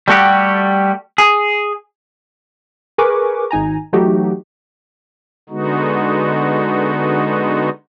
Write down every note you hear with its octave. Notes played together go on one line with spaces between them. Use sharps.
G3 A3 F#4 G4
G#4
G#4 A#4 B4 G#5 C#6 D6
G#1 D#4 G#5 A#5
E3 F#3 A3 D#4 F#4 G4
D3 G#3 B3 D#4 F#4